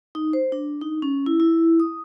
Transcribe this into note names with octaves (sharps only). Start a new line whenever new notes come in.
D#4
C5
D4
D#4
C#4
E4
E4
D#6